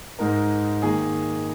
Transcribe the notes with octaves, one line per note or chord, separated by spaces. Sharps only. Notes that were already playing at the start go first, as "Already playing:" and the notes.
G#2 G#3 D#4 A#4
D#3 A#3 G#4